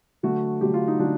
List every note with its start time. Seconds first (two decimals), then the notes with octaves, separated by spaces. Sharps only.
0.23 D3 F#3 A3 F#4
0.61 D3 F#3 A3 G4
0.74 F4
0.88 D#4
0.99 D3 F#3 D4